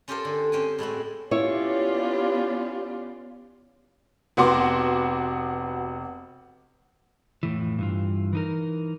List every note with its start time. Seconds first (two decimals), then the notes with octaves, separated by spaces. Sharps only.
0.08 C#4 F4 G4 A4 A#4 C5
0.25 D3
0.52 C4 C#4 G5 G#5
0.78 A2 G#3 E4 F#4
1.31 B3 C#4 E4 F4 G4 C#5 D5
4.37 F1 B3 F#4 C6 D6
7.43 F2 A2 E3
7.78 G2 E3 F4
8.33 E3 D#4 A#4